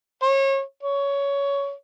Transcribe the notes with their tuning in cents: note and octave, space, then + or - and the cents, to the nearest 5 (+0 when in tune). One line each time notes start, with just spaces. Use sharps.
C#5 -30
C#5 +15